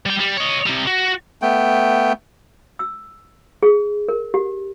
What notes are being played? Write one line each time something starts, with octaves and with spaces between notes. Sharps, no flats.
G3 G5
G3
C#5 D#5
C3 G3
F#4
A3 B3 G5
E6
G#4
A#4
G4